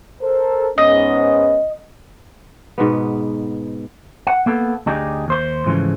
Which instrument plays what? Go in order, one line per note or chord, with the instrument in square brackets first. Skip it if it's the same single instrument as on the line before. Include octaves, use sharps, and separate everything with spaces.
[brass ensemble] A4 A#4 C5
[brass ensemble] G#2 B3 C#4 [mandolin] D#5
[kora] G#2 B2 B3
[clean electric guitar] F#5
A#3 B3 A4
D2 D4 D#4 G4 G#4
D#2 C5 C6
G#2 C#3 E3 F3 G#3 A3